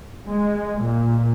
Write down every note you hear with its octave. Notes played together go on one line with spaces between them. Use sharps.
G#3
A#2